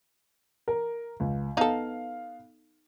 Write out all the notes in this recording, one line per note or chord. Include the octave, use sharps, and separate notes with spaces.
A#4
C#2
B3 D#4 A4 F5